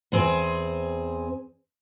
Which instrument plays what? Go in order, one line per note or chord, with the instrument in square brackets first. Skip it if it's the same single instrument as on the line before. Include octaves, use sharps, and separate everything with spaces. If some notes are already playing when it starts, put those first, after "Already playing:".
[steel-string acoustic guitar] E2 C4 G#4 C5